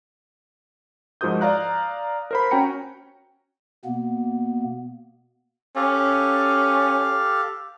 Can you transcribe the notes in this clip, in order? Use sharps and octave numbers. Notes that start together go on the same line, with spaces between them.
G#2 F3 F#4 A#4 D#6 G6
D5 F5 A#5 F#6
A#4 C5 B5
C#4 F#4 G5 A#5 C#7
B2 A#3 B3
C#4 G4 A4 F5